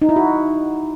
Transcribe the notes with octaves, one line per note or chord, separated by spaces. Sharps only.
D#4
E4
F#4